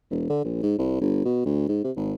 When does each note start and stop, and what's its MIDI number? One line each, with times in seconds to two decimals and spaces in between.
0.10 0.26 28
0.30 0.42 50
0.44 0.58 34
0.63 0.74 44
0.79 0.97 36
1.01 1.25 31
1.25 1.43 47
1.45 1.65 38
1.69 1.80 44
1.84 1.92 48
1.96 2.14 32